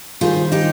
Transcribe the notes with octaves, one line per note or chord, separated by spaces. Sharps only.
D#2 D#3 G3 C4 F4 G#4
D#4 G4